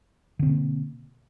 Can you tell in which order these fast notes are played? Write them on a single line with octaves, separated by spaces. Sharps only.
D3 C4 B2 A#3